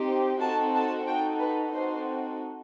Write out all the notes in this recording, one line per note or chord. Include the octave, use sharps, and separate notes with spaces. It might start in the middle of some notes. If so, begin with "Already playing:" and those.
Already playing: C4 D#4 G4
C4 D#4 F#4 A4 A5
A5
D#4 F#4 A4 G5
B4
C4 D#4 F#4 A4 C5